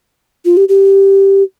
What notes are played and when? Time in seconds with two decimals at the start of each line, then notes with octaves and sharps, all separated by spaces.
0.45 F4
0.57 G4
0.69 G4